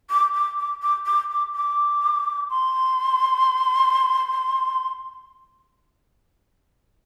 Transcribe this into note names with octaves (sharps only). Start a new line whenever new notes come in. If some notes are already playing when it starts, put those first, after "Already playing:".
D6
D6
D6
D6
D6
D6
D6
C6